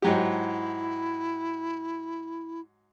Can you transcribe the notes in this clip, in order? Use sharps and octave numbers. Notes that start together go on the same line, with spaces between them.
G#2 F#3 E4 G4